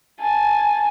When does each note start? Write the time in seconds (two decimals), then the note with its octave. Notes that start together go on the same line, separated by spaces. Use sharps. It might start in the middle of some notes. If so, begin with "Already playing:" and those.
0.21 G#5 A5